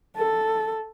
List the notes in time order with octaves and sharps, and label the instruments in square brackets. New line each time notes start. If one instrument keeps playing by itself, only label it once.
[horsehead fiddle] A4